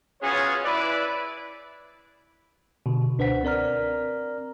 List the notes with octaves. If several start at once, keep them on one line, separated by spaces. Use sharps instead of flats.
B3 C#4 F4 F#4 G#4 C#5
E4 B4 D5
B2 D3
C#2 D4 B4 C5 F#5 B6
C4 A#4 D5 A#5 F6